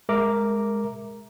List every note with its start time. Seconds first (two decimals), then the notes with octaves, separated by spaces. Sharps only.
0.09 G#3 A#4 E5 A#5 D6